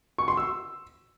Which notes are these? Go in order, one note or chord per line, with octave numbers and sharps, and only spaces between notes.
C#6
C6
E6